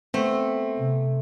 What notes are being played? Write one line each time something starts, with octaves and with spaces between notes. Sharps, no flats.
A3 B3 C4
C3